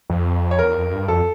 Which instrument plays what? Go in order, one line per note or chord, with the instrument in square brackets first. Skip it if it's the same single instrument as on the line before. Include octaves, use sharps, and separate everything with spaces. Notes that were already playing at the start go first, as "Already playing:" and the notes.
[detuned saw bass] F2
[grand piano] C#5
[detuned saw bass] E2 [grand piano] A#4
[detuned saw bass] F2
G2
[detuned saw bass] F2 [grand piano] A4